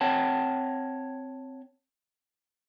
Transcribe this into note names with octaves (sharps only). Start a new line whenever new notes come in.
C4 C#5 F#5 G5 A5